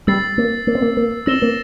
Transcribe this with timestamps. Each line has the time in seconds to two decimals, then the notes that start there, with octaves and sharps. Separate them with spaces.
0.07 G3 E6 A6 C7
0.38 A#3
0.67 A#3
0.75 C4
0.82 A#3
0.97 A#3
1.26 C4 E6 A#6 E7 G7
1.42 A#3